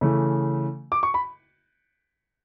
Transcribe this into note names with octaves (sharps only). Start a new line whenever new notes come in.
C#3 E3 A3
D6
C#6
B5